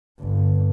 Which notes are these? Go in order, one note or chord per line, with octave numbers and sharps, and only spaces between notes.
G1